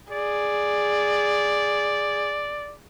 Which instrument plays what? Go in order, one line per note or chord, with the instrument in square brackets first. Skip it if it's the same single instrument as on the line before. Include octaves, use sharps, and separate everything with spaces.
[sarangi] G#4 [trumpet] D5